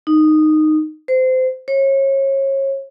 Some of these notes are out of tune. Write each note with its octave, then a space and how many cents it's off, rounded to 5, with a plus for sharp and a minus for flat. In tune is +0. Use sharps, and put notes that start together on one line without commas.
D#4 -10
C5 -25
C#5 -30